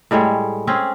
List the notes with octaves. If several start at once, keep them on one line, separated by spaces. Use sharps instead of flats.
A2 G3 G#3 C#5
C4 C#4 G#4